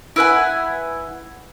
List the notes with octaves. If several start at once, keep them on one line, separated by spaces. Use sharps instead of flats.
E4 B4 F#5 G#5